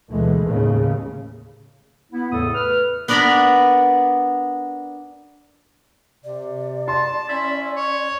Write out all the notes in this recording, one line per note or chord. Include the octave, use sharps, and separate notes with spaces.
D2 B2 E3 G#3 A3
D#2 A2 C#3
B3 E4
E2 A2 C#3 A3 A4 D#6
B4 F6
B3 D4 A#4 D5 A#5 B5
C3 D5
A5 C6
C#4 E4
C#5